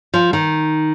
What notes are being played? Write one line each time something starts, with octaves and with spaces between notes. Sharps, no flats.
F3
D#3